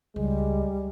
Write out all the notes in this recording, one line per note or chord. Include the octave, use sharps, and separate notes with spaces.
C#2 G3 G#3